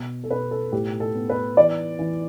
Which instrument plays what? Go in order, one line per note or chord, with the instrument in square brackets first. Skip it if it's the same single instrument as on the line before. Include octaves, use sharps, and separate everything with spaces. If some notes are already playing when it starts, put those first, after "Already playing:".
Already playing: [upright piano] B2
A4
B2 B4
A4
A2 G4
A4
B3
B4
E3 D5
E3